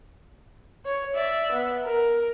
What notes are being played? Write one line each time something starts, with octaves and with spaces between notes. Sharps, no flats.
C#5
D5 E5
B3
A#4